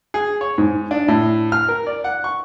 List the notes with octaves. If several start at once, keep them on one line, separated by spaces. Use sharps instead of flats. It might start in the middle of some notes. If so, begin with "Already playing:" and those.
G#4
C#5
G#2
D4
A2
F6
A#4
D5
F#5
C#6